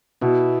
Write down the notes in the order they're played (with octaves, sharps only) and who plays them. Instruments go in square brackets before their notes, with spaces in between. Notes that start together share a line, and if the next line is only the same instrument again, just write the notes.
[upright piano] B2 [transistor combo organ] B3 E4